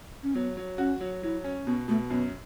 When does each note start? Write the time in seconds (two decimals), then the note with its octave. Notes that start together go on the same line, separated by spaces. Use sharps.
0.23 C#4
0.35 F#3 B3
0.57 F#3
0.78 C#4 F#4
1.01 F#3
1.23 F#3 E4
1.44 C#4
1.66 B2 B3
1.88 B2 A3
2.10 F#2 B3